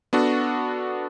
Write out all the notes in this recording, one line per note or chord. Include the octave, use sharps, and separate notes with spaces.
B3 D4 F#4 A4